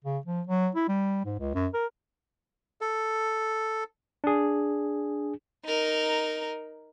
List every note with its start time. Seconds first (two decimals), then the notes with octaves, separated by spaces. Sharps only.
0.04 C#3
0.26 F3
0.47 F#3
0.75 E4
0.89 G3
1.25 G#2
1.40 C#2
1.55 F#2
1.74 A#4
2.81 A4
4.24 D4 G#4
5.65 D#4 A#4